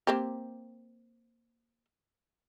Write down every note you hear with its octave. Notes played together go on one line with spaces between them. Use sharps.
A#3 C4 G4